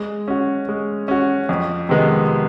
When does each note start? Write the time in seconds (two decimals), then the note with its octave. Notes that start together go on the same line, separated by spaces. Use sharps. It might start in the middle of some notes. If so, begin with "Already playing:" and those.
Already playing: G#3
0.28 C#4 F#4
0.69 G#3
1.08 C#4 F#4
1.49 F2
1.89 C3 D#3 G#3 B3